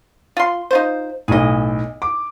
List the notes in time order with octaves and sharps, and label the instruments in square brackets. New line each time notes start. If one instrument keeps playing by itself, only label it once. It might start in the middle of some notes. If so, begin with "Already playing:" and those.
[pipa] F4 C6
D#4 F4 C5
[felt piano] B1 A2 [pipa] G#4 D#5
[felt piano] D6